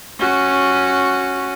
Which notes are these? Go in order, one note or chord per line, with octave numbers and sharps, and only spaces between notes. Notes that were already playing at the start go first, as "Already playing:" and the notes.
C#4 F#4